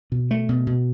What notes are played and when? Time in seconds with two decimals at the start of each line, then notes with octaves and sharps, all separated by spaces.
0.12 B2
0.31 A3
0.49 B2
0.67 B2